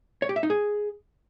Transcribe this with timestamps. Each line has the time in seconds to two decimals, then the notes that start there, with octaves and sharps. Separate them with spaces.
0.22 C#5
0.29 G4
0.36 E5
0.43 D#4
0.50 G#4